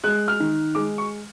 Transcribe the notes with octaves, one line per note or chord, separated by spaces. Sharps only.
G#3 F#6
F6
D#3
G#3 D6
C#6